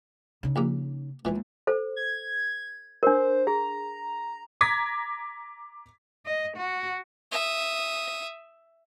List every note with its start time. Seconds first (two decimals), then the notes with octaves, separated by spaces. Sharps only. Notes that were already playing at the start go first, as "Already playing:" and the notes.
0.43 C#3 D#4
0.56 A#1 G2 A#3
1.25 D#2 A#2 E3 G#3
1.67 A4 C5
1.96 G#6
3.03 D4 A#4 C5
3.47 G#4 A#5
4.61 A#5 D6 G#6 A#6 B6
6.26 D#5
6.57 F#4
7.32 E5 D#6